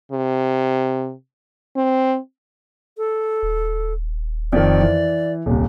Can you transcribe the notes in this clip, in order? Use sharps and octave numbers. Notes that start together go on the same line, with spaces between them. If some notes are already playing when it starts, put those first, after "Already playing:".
C3
C4
A4
D#1
F2 D#3 D5
E3
D#1 C2